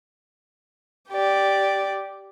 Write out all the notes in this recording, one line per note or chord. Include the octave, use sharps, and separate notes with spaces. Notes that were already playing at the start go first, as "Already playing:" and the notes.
G4 D5